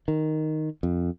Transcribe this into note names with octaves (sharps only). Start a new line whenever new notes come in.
D#3
F2